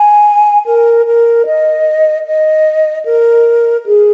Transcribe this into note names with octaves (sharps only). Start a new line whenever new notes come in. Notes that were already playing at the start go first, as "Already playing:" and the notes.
Already playing: G#5
A#4
A#4
D#5
D#5
A#4
G#4